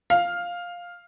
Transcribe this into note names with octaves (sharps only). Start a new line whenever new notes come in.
F5